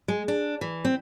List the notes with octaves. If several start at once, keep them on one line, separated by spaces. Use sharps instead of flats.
G#3
D4
E3
C4